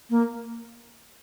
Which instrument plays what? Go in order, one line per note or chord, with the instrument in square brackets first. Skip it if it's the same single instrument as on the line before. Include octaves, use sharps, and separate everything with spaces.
[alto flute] A#3